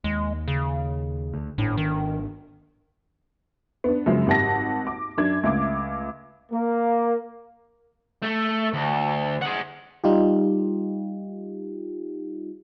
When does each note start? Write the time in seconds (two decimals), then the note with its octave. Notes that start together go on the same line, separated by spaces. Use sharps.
0.04 D#2 G#3
0.48 C#3
1.34 D2
1.58 G#1 A2 D4
1.77 D#3
3.84 B3 D4
4.06 F#2 C#3 F3 G#3
4.27 G#1 G3 F#5 A5 A#6
4.87 D6
5.18 F#2 D4 G#6
5.43 C#2 A3 D6
6.52 A#3
8.22 A3
8.73 D2
9.42 G#4 F#5
10.04 G3 D#4 F4 G4